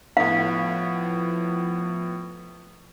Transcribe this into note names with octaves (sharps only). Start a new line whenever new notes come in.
A2 F3 B3 F5